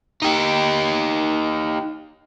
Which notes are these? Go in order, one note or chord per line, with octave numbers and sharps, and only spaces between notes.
D#4 G4